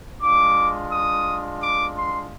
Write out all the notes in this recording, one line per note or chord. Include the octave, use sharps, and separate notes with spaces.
G#3 D4 F4 D6
D#6
D6
C6